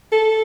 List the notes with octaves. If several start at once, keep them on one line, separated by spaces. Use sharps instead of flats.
A4